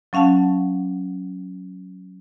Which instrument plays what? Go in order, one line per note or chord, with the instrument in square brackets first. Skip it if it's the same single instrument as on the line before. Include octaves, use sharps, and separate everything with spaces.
[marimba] F#3 C#4 F5 F#5 A5